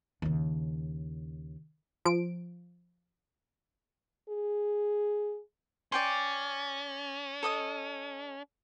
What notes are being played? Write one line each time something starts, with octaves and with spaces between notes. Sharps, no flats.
D#2 C#3
F3 D7
G#4
C#4 D5 G5 C6
A4 D#5 D#6